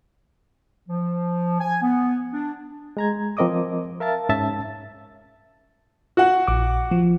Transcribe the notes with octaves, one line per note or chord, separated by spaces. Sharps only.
F3
G#5
B3
D4
G#3 A#5 G#6
F3 C4 A#4 D#5 D6 D#6
A#4 E5 F5 A5 A6
G#2 C#4 E5 A5 A6
F#4 F#5
A#1 D6
F3